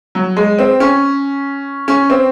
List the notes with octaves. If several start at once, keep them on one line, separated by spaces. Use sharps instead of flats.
F#3
G#3
C4
C#4
C#4
C4